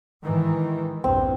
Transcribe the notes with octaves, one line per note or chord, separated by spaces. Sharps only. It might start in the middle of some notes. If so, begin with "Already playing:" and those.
G#2 D#3 E3
A#1 E2 G2 C4